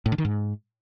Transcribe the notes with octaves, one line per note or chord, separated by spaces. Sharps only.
A2
D3
D#3
G#2